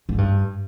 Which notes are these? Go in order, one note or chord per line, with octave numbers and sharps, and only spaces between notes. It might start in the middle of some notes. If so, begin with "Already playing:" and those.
G#2
G2